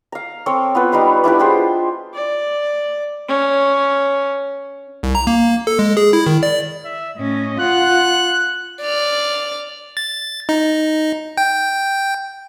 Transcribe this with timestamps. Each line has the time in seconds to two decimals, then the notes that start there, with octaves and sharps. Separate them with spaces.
0.12 F5 A#5
0.46 C4 A4 C#5 D6
0.75 B3 F4 B4
0.92 G3 D#4 B4 F5
1.24 D4 E4 G4 B4
1.39 F4 G4 G#4 C5
2.14 D5
3.28 C#4
5.03 C2
5.15 A#5
5.27 A#3
5.67 A4
5.79 G#3
5.97 G#4
6.13 E4
6.26 D#3
6.43 D5
6.85 E5
7.17 A2 C#4 D#5
7.60 F4 F#5 F#6
8.82 D5 F6
9.97 A6
10.49 D#4
11.37 G5